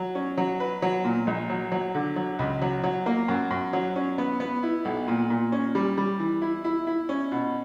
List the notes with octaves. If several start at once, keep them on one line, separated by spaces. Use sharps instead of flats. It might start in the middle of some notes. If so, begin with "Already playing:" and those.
Already playing: F#3
C#4
F#3
B4
F#3
A#2
A#1
F#3
F#3
D3
F#3
C#2
F#3
F#3
A#3
F#2
F#2
F#3
C#4
B3
B3
E4
B1
A#2
A#2
C#4
G3
G3
E3
E4
E4
E4
C#4
B2